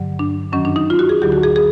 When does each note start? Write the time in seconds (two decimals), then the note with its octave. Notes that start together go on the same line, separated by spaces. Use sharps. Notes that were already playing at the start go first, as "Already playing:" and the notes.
Already playing: G2 D3 F#3
0.19 D4
0.52 F#2 D#3 F#3 C#4
0.65 D4
0.76 D#4
0.90 F4
0.99 F#4
1.09 G#4
1.22 D2 D3 F#3 G4
1.32 F#4
1.43 G#4
1.56 G#4